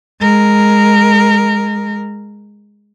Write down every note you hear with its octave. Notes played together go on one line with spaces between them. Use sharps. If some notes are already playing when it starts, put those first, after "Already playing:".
G#3 A#4